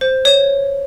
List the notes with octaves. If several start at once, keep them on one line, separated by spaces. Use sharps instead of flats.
C5
C#5